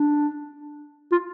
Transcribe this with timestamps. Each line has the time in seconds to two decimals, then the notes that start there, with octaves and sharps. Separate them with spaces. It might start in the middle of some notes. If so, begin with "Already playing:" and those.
Already playing: D4
1.12 F4